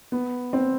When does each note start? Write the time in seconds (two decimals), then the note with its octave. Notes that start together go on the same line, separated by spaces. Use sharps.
0.12 B3
0.53 C4